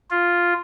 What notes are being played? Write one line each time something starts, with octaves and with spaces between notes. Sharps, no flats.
F4